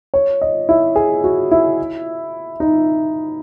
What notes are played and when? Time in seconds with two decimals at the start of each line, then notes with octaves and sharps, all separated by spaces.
0.14 C#5
0.42 D#5
0.69 E4
0.96 G#4
1.24 F#4
1.51 E4
2.60 D#4